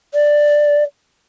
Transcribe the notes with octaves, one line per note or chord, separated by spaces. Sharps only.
D5